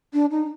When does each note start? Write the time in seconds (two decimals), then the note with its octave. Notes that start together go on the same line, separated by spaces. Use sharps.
0.13 D4
0.31 D#4